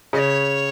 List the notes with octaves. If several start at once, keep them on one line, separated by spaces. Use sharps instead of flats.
C#3 D#5
C#5